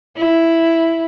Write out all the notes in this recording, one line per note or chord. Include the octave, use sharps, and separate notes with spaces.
E4